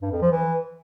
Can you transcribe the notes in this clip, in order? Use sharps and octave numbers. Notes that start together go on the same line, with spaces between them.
G2
F2
F3
E3